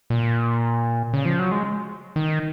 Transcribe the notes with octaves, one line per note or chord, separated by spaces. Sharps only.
A#2
C#3
F3
F#3
G#3
D#3